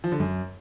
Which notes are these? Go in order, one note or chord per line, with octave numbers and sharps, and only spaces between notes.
F3
D3
F#2